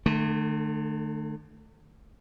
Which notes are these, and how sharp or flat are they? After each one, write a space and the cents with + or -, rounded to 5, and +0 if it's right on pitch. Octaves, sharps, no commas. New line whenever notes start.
D3 +45 A3 +0